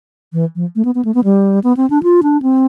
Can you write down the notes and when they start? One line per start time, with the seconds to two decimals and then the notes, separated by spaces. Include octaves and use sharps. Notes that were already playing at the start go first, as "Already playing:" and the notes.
0.33 E3
0.56 F3
0.76 A3
0.85 B3
0.95 B3
1.05 A3
1.14 B3
1.24 G3
1.64 B3
1.77 C4
1.90 D4
2.03 F4
2.23 D4
2.42 C4